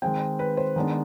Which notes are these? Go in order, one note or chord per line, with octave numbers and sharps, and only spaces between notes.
D#3 G#3 C4 G5
B4
C5
D#3 G#3 B3 D4